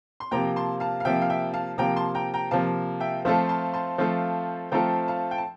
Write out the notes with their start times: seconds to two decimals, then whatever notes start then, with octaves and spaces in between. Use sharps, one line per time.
0.20 C6
0.31 C3 F3 A#3 G5 A#5
0.56 A5 C6
0.80 F5 A5
1.00 F5
1.05 C3 F3 A#3 E5 G5
1.22 F5
1.30 E5 G5
1.54 F5 A5
1.78 C3 F3 A#3 G5 A#5
1.96 A5 C6
2.15 G5 A#5
2.34 G5 A#5
2.51 C3 F3 A#3 F5 A5
3.00 E5 G5
3.25 F3 A3 C4 F4 A4 C5 E5
3.49 A5 C6
3.73 A5 C6
3.98 F3 A3 C4 F4 A4
4.72 F3 A3 C4 F4 A4 G5 A#5
5.08 F5 A5
5.31 G5
5.38 A5